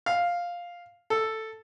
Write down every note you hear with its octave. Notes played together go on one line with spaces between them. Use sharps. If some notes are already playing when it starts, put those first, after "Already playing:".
F5
A4